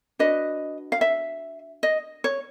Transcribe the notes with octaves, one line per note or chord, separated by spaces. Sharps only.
D4 F#4 B4 D#5
F5
E5
D#5
C#5